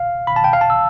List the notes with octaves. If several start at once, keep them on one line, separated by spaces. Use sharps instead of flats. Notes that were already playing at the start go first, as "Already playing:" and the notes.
Already playing: F5
B5
A5
G5
F5
A5
E6